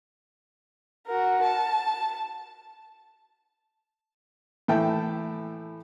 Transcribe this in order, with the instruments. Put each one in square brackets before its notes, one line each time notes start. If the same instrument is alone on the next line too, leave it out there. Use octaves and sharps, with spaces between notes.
[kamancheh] F#4 A#4
A5
[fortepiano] A2 E3 E5 G5 A5